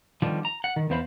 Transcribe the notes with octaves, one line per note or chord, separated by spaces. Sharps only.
D3 D#3 F3 G3 B3
A#5
F#5
D#3
E2 B3 C5 F5 B5